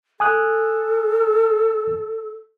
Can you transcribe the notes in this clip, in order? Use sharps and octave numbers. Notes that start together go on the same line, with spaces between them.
A4 G#5 D#6 F#6